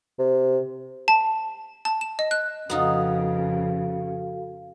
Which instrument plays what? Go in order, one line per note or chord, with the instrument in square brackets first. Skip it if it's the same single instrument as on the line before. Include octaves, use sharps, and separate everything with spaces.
[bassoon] C3
[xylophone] A5
A5
E7
D#5
F#6
[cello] F2 C#3 [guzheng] B3 D#4 F4 [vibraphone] F#4 A4 F5